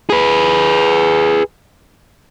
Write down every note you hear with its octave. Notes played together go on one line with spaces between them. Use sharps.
G#4 B4